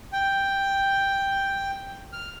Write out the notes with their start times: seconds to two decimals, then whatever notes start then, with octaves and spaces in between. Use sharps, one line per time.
0.13 G5
2.13 F6